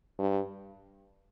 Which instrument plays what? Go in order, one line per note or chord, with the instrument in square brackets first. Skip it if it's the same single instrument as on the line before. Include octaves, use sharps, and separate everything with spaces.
[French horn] G2